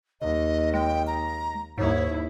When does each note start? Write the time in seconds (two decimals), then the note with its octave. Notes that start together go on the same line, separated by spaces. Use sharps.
0.21 D#2 D#5
0.74 G#3 G5
1.07 A#5
1.78 D#2 G#2 E4 C#5